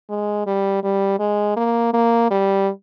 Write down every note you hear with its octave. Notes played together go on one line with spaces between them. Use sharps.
G#3
G3
G3
G#3
A#3
A#3
G3